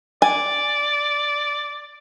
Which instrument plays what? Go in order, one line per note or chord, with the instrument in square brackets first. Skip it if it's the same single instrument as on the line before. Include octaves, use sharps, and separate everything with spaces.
[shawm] D5 [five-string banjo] G#5